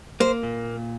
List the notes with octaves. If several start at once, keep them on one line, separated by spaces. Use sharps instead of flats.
A#3 C5
A#2